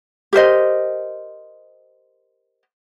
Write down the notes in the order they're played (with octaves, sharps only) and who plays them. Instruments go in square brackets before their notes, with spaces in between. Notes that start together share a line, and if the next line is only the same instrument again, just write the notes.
[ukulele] G4 A#4 C5 D#5